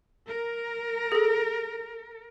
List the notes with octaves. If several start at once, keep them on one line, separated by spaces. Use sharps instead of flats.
A#4
G#4 A4